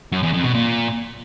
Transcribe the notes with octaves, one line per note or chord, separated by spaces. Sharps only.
F#2
E2
F2
B2
A#2